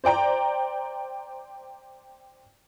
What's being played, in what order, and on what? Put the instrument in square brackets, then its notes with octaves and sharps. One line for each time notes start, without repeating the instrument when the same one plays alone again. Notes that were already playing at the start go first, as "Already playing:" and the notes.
[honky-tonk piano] C5 D5 G5 A#5